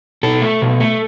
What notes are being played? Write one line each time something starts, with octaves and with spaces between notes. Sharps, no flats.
B2 A4
A3
B2
A3